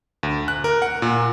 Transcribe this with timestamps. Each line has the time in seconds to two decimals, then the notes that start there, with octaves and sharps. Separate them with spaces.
0.23 D2
0.48 F#6
0.64 A#4
0.82 F#5
1.02 A#2